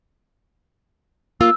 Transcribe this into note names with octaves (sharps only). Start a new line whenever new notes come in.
A#3 F4 E6